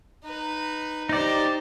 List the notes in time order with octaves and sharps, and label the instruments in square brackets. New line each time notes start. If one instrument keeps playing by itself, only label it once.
[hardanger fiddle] D#4 B4
[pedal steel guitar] D#4 D5 [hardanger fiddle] G4 C5